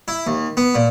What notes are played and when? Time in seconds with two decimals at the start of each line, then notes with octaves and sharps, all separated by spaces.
0.08 E4
0.27 D#2
0.57 B3
0.75 A#2